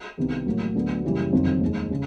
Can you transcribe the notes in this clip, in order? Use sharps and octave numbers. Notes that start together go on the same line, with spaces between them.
C2 C3 D#3 G3 B3
A1 A2 F#3 A#3
D2 D3 F#3 B3
F#2 C#3 E3 G3 A#3
G1 F2 C3 D#3 F#3
D#2 D#3 G#3
C#3